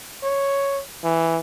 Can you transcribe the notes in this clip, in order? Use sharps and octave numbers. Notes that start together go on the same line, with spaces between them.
C#5
E3